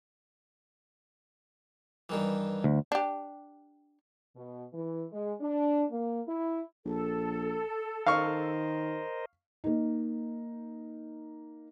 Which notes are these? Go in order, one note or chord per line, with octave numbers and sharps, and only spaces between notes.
G2 D#3 E3
D2
D4 G4
B2
E3
G#3
D4
A#3
E4
A#1 A4
D#3 A#4 C5 D#5 F5 C#6
A#3 D#4